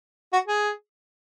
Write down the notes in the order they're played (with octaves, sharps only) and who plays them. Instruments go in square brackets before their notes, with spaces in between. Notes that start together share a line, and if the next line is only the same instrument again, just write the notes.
[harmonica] F#4
G#4